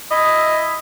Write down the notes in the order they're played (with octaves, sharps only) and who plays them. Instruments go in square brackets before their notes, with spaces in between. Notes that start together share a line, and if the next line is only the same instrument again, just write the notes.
[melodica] E4 E5 [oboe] D#5